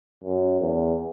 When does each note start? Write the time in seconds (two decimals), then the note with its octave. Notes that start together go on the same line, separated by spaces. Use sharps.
0.24 F#2
0.61 E2